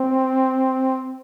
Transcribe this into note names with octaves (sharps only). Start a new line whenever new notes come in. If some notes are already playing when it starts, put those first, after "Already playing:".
Already playing: C4